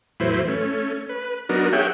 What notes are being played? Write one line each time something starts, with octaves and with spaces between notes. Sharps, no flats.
E2 A2 F#3 E4 B4 C5
A3 C#4
B4
F#3 B3 D4 D#4 F#4 A#4
G4 G#4 C#5 E5 F#5 G5